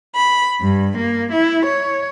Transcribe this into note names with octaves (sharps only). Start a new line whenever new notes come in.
B5
G2
A#3
E4
C#5